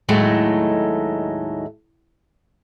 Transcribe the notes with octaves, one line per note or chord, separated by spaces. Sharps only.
D#2 A2 F#3 G#3 A3 D#4